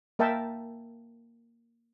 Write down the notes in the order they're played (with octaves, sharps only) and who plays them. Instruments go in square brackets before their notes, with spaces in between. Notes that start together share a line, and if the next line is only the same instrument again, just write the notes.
[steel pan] A#3 A#4 E5 G5 A5